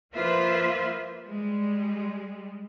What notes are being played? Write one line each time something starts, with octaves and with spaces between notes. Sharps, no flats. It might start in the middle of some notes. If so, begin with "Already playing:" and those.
F3 A#3 F4 B4 C5 E5
G3 G#3